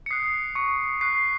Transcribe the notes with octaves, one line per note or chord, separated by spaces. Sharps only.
C#7
D#6 F#6 C7
C#6 C#7
C#6 F#6 C7